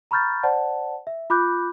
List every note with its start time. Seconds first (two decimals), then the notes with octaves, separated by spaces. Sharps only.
0.11 A#5 B5 C#6 F6 G6 A6
0.43 C5 D5 F#5 A5
1.07 E5
1.30 F4 B5 D6 F#6 G6